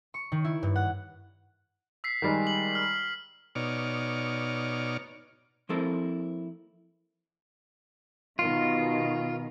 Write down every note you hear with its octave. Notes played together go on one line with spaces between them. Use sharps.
C#6
D#3
E4
G2
F#5
E6 B6 C7
D#3 G3 G#3
F#7
F6
B2 D#4 C#5 D5 F6
F3 A#3 C4 E4 A4 A#4
B2 D#3 F4